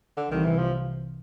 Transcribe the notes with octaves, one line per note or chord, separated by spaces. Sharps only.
D3
C2 C3 D#3 E3
E3
F3